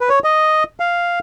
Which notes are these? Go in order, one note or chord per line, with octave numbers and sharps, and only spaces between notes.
B4
C#5
D#5
F5